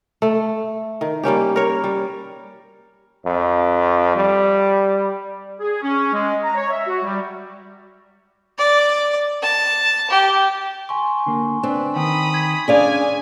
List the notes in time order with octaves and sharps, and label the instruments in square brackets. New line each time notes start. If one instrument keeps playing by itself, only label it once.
[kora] A3 A4
D#3
G3 A#3 C#4 G4
A#4 C#5
G3
[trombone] F2
G3
[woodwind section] G#4
C#4
G#3
A#5
C#5
E5
F#4
G3
[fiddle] D5
A5
G4
[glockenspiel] G#5 C6 C#6
[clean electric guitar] D3 A#3
[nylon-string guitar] C4 [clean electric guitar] D4 [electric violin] B4
[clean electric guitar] D#3 D#4 G5 [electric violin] B5 D#6
[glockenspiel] G#6 B6
[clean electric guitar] C#4 D4 [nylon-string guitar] G#4 D5 F5 [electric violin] G#5